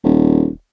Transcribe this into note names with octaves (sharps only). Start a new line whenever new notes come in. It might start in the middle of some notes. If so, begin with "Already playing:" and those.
D#1